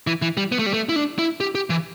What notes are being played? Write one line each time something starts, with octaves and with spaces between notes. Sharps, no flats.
E3
E3
G3
B3
A3
G3
A3
E4
D4
E4
G4
G4
E3